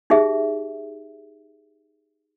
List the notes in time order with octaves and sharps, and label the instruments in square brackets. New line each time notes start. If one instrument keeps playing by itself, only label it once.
[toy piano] D#4 G4 G#4 E5